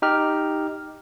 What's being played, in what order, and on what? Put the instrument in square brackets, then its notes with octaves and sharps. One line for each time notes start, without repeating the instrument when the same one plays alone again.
[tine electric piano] D#4 G4 F6